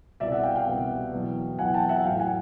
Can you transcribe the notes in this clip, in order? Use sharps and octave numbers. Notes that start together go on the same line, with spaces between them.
C2 B2 G3 D5 E5
E5 F#5
F5 G5
F5 G5
C2 B2 G3
E2 B2 F#3
E2 B2 F#3 F#5 G#5
G5 A5
E5 F#5
A2 F#3 F5 G5
F#5 G#5